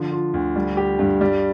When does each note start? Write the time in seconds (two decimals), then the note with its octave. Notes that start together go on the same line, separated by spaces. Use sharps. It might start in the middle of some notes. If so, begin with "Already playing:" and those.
Already playing: D3 F3
0.12 F4
0.34 D2
0.56 G3
0.77 G4
0.99 G2
1.21 G3